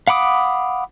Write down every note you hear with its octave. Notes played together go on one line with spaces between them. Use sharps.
F5 F#5 B5 D6 D#6